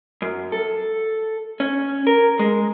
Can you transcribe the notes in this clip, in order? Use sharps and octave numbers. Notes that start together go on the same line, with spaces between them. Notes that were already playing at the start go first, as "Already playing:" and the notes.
F#2
A4
C#4
A#4
G#3